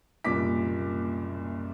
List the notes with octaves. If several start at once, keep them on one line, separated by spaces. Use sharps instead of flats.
F#1 C2 A#2 D6 B6